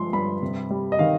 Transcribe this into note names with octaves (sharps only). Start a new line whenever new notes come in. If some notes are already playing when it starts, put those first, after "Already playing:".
Already playing: G2 F3 G#3 C6
G2 B5
C3
G3
D#5
D#3 F5